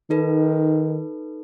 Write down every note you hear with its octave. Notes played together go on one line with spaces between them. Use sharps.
D#3 D#4 A4 B4